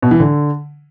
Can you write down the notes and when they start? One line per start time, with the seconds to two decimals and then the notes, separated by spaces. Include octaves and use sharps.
0.02 B2
0.11 E3
0.20 D3